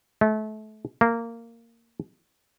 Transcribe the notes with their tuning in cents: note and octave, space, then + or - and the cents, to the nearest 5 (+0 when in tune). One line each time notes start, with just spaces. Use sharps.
A3 -30
A#3 -15